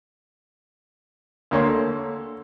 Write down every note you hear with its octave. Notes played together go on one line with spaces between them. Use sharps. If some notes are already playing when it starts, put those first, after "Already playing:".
D2 A#3 C#5 C6
A4